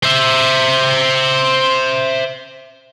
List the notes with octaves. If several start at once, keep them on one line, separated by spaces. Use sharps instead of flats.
C5 E5